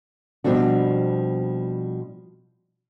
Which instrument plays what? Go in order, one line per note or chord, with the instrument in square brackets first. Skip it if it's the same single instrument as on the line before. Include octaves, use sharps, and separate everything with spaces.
[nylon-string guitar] B2 F3 G3 C4 D4 F#4